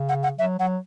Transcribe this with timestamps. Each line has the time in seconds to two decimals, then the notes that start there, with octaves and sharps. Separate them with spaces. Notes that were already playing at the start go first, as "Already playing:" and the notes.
Already playing: C#3
0.09 F#5
0.23 F#5
0.38 F#3 E5
0.59 F#3 F#5